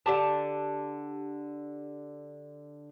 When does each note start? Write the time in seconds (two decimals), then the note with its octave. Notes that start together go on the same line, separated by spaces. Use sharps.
0.06 D3 G4 A5